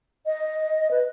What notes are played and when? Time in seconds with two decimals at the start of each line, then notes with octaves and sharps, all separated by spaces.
0.26 D#5
0.91 B4